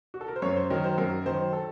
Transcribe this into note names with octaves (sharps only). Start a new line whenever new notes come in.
F#4
A4
A#4
C5
F#2 C#5
C5
D#3 F#3 A#4
C5
F#2 A#4
D#3 F#3 C5
A4